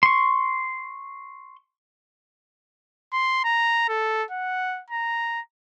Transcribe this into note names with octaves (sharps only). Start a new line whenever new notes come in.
C6 C#6
C6
A#5
A4
F#5
A#5